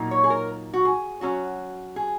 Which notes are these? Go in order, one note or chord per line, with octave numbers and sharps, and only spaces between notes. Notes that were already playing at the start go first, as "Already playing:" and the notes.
Already playing: A#2 F#3 A#3 D#4
C#5
G#4
A#4
F#4
G#4
F#3 C#4 F#4
G#4